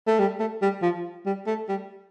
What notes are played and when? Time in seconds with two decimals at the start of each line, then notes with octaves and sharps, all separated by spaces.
0.07 A3
0.19 G3
0.40 A3
0.62 G3
0.82 F3
1.26 G3
1.47 A3
1.69 G3